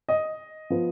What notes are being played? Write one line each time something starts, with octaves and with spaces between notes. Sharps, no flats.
D#5
F3 B3